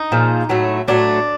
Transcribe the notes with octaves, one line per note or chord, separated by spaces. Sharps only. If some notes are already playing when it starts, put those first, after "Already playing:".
Already playing: D#4
A#2 F3 G#3
A2 F#3 A3
A2 F#3 A3 D4